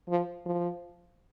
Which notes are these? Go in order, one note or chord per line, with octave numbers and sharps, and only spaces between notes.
F3
F3